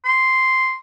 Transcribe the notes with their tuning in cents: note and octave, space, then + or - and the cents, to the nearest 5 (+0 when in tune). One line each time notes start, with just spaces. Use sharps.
C6 -5